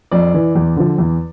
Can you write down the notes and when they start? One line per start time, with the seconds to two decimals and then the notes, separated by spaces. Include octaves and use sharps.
0.11 F2 D5
0.34 E3
0.55 E2
0.76 D3 F3
0.98 E2